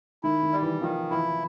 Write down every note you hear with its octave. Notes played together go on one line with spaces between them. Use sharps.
D#3 E4
D#3
G3
E3
D#3 F3
E3 E4